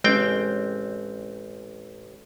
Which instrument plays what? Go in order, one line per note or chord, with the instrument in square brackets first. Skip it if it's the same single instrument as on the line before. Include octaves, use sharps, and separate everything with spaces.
[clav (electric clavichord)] A1 C4 G5 [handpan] G#3 C#4